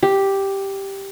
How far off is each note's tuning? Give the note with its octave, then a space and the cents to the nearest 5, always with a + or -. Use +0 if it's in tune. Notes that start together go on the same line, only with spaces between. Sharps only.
G4 +0